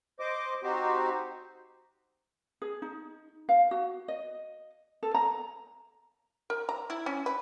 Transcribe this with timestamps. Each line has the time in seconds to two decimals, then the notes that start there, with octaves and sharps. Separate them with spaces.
0.20 C5 D#5 D6
0.63 C4 D#4 F#4 G4 C5
2.62 G#4
2.82 D#4
3.49 F5
3.71 F#4
4.08 D#5
5.03 A4
5.14 A#5
6.50 A#4
6.69 A#5
6.90 E4
7.06 C#4
7.26 B4